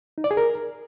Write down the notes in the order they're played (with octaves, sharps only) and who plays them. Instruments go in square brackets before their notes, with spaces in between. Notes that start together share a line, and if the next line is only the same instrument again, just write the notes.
[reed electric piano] D#4
D5
G#4
A#4